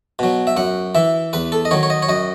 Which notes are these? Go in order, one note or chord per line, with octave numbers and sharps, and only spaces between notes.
B2 F#3
E5
F#2 F#5
E3 E5
E2 B4
A4
D#5
D#3 F#3 C#5
C#5
D#5
C#5
F#2 D#5